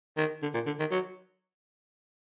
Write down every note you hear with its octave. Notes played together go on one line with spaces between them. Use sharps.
D#3
D3
A#2
D3
D#3
F#3